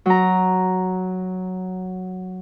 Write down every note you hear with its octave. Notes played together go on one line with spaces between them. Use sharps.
F#3 A#5